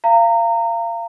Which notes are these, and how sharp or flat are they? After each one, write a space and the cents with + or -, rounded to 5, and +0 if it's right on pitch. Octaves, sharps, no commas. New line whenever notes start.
F5 -25 A#5 -25